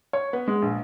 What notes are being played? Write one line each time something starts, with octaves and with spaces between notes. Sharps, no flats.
C#5
B3
G#3
A#1